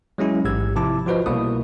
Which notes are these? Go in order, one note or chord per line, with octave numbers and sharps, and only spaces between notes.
F#3 G#3 C#4 E4
A1 G#2 G4 E6 G#6
C3 F3 E4 A5 D6
F3 F4 F#4 B4 C5 D#5
C2 B2 A#3 E4 D#6